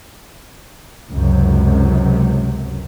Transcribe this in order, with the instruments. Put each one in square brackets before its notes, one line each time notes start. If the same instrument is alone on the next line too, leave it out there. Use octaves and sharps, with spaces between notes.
[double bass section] C#2 F#2 C3